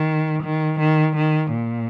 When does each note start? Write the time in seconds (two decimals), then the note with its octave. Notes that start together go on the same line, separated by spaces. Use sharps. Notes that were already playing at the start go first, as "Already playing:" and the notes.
Already playing: D#3
0.43 D#3
0.79 D#3
1.16 D#3
1.51 A#2